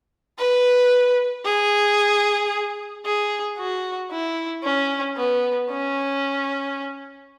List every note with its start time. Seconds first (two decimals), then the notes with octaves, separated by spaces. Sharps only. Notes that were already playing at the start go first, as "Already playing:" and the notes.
0.39 B4
1.45 G#4
3.05 G#4
3.58 F#4
4.11 E4
4.64 C#4
5.17 B3
5.71 C#4